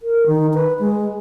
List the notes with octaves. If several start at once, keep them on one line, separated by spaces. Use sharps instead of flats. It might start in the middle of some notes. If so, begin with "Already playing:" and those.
A#4
D#3
B4
G#3